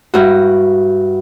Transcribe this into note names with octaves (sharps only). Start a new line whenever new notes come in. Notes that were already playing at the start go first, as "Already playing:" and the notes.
G2 E4 F#4